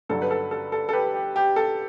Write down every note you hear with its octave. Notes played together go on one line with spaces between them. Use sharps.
G1 G2 F#3 A4
B4
A4
A4
A4
A4
G4 B4
G4
G4
A4